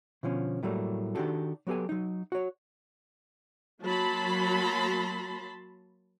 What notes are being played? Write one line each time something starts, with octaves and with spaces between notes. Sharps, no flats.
B2 D3 F3 C#4
A2 F#3 G3 A3 A#3
D#3 D4 F#4 G4 A4
F#3 B3 G4 A4 G#5
F#3 D#4
F#4 C#5
F#3 A#3 A5 B5 C6